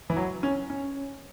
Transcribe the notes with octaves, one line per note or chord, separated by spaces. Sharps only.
E3
F#3
C#4
C#4